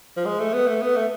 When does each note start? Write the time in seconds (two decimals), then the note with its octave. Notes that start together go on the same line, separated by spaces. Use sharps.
0.17 F3
0.25 G#3
0.40 A3
0.54 B3
0.68 A3
0.82 B3
0.96 A3